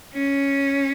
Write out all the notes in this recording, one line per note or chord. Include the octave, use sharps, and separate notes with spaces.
C#4